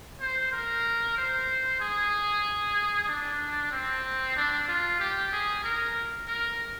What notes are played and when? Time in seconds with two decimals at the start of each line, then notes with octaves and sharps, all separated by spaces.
0.20 C5
0.52 A#4
1.17 C5
1.80 G#4
3.08 D4
3.71 C4
4.37 D4
4.68 F4
5.00 G4
5.32 G#4
5.64 A#4
6.28 A#4